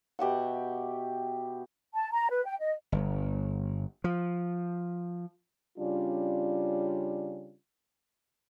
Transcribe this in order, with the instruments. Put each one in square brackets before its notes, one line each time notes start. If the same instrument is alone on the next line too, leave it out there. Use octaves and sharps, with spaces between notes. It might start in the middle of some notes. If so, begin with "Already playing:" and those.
[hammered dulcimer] B2 G4 E5 F#5
[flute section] A5
A#5
B4
G5
D#5
[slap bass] G1
F3
[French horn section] C#3 G3 C#4 D4 F4